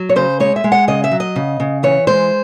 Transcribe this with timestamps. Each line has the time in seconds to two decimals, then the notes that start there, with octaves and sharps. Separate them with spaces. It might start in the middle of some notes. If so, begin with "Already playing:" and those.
Already playing: F#3
0.09 C#5
0.16 C#3 C5
0.40 G#3 C#5
0.56 E5
0.64 G#3
0.72 F#5
0.88 C#3 D#5
1.04 E5
1.12 F#3
1.20 D#5
1.36 C#3
1.60 C#3
1.83 E3 C#5
2.07 G#3 C5